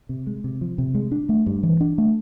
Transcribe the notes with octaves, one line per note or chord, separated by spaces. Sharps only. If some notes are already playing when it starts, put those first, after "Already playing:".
C3
G#3
C3
F3
C3
G#3
D4
A3
G2
E3
D4
A3